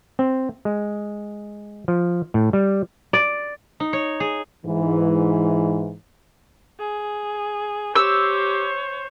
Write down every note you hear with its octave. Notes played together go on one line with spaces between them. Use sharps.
C4
G#3
F3
A2
G3
D5
D#4
C#5
G#4
G#2 E3
G#4
G4 C5 C#5 E6